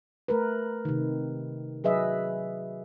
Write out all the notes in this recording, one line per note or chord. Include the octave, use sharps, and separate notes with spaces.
A3 A#4 B4
C3 D#3
F#3 G#4 B4 D#5 E5